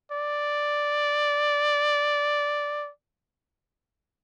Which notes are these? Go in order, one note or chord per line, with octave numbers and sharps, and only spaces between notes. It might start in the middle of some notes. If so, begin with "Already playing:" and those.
D5